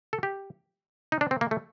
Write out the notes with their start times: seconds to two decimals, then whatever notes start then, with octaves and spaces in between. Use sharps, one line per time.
0.13 A4
0.23 G4
1.12 D#4
1.21 D4
1.31 C4
1.41 A#3
1.51 A3